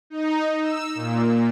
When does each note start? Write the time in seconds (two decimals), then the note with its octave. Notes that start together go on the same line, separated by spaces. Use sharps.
0.10 D#4
0.62 E6
0.95 A#2